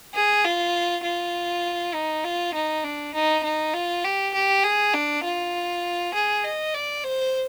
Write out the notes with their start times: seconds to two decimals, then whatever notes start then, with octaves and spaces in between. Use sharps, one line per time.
0.14 G#4
0.45 F4
1.04 F4
1.94 D#4
2.25 F4
2.54 D#4
2.84 D4
3.14 D#4
3.44 D#4
3.74 F4
4.05 G4
4.34 G4
4.64 G#4
4.94 D4
5.24 F4
6.14 G#4
6.44 D#5
6.75 D5
7.04 C5